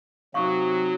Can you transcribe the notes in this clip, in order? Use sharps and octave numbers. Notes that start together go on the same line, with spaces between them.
C3 F#3 D#4 F#4 F5 C#6